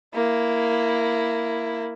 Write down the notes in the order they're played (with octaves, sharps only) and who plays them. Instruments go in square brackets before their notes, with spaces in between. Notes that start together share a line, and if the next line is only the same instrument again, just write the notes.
[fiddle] A#3 E4